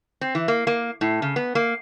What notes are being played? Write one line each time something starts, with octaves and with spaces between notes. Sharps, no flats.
C4
E3
A#3
A#3
A2
C#3
B3
A#3